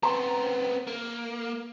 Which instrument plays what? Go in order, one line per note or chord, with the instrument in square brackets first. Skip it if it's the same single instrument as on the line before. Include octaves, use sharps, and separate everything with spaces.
[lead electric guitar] B3 C4 [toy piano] A#5 C6
[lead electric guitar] A#3